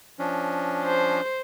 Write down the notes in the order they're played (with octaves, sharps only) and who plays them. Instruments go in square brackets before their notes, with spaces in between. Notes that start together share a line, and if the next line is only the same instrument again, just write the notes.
[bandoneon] F3 C#4 D4
[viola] C5